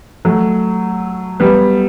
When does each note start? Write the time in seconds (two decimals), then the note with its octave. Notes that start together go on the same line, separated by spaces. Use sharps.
0.25 F#3 A3
1.40 G3 B3